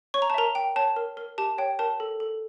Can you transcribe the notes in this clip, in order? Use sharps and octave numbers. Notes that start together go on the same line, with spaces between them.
C#5 C#6
A#5
A5
A#4 E5 A#5
G5
C#5 A5
A#4
A#4
G4 A5
C#5 G5
A#4 A5
A4
A4